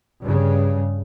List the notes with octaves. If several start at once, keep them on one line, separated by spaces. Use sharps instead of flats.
G2 C#3